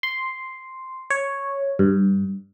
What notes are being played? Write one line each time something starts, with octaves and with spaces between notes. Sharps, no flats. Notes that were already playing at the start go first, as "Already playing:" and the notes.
C6
C#5
G2